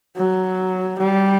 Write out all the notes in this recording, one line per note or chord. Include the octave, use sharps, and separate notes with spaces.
F#3
G3